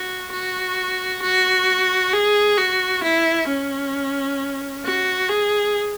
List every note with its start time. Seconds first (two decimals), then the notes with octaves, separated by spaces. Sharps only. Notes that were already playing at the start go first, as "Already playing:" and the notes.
Already playing: F#4
0.32 F#4
1.22 F#4
2.13 G#4
2.58 F#4
3.03 E4
3.48 C#4
4.85 F#4
5.30 G#4